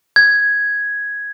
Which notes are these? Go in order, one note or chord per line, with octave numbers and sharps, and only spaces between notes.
G#6